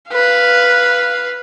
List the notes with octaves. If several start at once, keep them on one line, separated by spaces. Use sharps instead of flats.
B4 F5